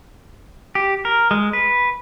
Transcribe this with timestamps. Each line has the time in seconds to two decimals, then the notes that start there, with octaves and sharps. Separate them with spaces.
0.75 G4
1.05 A#4
1.31 G#3
1.53 B4